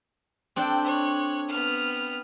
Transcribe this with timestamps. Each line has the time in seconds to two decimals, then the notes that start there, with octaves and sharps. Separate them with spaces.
0.56 C4 D4 A4 G5
0.85 C#5 F#6
1.49 B3 F6